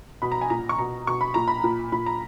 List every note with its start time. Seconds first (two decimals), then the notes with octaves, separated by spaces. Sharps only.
0.22 B2 B5
0.32 A#5
0.41 G#5
0.50 A#2 A#5
0.69 C#6
0.78 B2 A#5
1.07 B2 C#6
1.21 B5
1.34 A#2 A#5
1.48 B5
1.64 A#2
1.92 A#2 B5
2.06 A#5